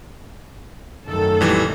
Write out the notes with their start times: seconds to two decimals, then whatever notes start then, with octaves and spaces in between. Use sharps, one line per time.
1.07 F#2 D#3 A3 A4
1.41 A#1 E3 G3